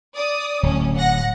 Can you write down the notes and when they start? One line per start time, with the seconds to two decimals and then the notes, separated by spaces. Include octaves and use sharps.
0.15 D5 D#6
0.63 D1 C#4
0.96 F#5 A#6